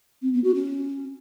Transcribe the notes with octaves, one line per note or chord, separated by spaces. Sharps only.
C4
B3
F#4
C#4